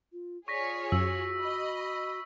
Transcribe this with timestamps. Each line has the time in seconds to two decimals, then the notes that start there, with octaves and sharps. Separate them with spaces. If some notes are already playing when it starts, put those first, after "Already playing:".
0.12 F4
0.48 F4 G#4 C#5 D5 C#6 A#6 B6
0.92 F#2 F#4 E6
1.41 D#5 B5